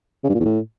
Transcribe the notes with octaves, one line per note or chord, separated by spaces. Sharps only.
C#3
G2
A#2
E2
A2